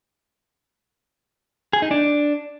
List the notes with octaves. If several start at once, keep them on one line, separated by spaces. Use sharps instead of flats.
G#4
D#4
D4